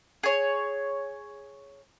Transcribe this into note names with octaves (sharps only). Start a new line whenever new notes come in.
G#4 C#5